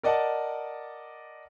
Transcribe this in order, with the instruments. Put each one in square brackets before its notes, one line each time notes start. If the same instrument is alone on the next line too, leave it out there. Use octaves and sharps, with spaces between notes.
[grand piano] A#4 D5 D#5 F#5 A5